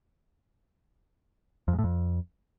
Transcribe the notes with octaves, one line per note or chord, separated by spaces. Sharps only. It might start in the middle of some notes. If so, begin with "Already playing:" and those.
F2
G#2
A2
F2